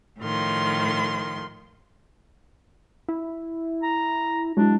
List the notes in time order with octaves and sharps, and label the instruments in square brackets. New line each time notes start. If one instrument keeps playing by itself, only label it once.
[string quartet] A2 D#3 F3 C6
[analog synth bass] E4
[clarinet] A#5
[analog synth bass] F#3 [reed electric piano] G#3 E4 [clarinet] D4